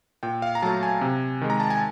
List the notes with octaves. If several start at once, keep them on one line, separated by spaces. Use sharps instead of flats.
A#2 G5
F5
A#5
F#3 A3 A5
G#5
C3
D#3 G#3
A#5
A5
G#5